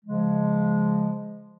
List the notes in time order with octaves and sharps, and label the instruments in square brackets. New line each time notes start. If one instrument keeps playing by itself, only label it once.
[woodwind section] C#3 F3 G#3